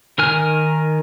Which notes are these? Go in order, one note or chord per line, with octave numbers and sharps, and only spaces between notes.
D#3 A#4 G#5 F6